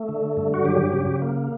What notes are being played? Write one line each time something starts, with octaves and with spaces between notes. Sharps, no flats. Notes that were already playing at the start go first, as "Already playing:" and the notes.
Already playing: A3
D3
G2
F#4
F#3 G4
C#3
A#3